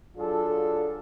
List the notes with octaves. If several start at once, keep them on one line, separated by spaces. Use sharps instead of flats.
F#3 D4 F4 G#4 A4